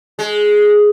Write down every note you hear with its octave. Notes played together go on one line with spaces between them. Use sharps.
G#3